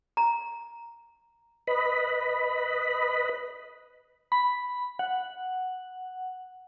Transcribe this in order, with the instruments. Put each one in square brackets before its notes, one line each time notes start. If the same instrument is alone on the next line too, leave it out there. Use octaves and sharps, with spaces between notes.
[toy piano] A#5
[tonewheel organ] B4 D#5 B5
[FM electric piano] B5
F#5